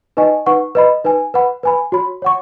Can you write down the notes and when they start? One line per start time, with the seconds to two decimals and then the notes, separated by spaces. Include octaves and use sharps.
0.17 D#4 B4 D#5 G#5 C#6
0.46 D#4 B4 F#5 C#6
0.75 B4 D#5 B5
1.04 D#4 B4 G#5
1.34 B4 F#5 B5
1.63 B4 G#5 B5
1.92 F#4 C#5 B5
2.22 C#5 F#5 C#6